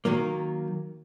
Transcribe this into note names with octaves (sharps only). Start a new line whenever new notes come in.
D#3 F#3 A#3